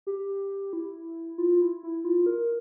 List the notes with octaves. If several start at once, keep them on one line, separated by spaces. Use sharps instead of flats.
G4
E4
F4
E4
E4
F4
A#4